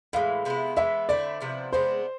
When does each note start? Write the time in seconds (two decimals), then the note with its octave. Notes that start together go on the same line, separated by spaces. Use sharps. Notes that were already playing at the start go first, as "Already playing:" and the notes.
0.13 A2 E3 G#3 F5
0.45 C3 G#3 B3 E4
0.76 E3 G#3 B3 E5
1.09 D3 A3 C4 E4 D5
1.40 C3 F3 B3 E4
1.73 C3 G#3 B3 D4 C5